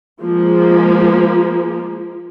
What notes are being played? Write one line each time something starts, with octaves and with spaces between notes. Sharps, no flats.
F3 G#3 A#3